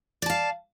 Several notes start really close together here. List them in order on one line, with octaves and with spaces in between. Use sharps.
D5 A5 F5